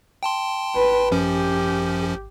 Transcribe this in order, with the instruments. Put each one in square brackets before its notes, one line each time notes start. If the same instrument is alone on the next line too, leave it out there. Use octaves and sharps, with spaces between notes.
[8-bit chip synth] G5 A5 C6
[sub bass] G#1 [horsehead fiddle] B4
[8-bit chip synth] F#2 F3 C#4 [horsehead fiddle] G4